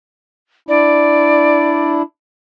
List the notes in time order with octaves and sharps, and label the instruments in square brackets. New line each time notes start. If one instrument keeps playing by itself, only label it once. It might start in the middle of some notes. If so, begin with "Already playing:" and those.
[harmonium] D4 E4 [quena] D5